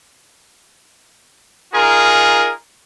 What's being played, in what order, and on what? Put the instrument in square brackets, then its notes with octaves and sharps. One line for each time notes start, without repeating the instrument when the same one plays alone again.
[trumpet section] D#4 F4 G#4 A#4